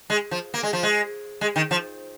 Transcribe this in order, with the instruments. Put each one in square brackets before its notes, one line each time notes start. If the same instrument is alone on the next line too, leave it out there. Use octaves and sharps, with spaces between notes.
[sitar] G#3
F3
A#3
G#3
F3
G#3
G#3
D#3
F3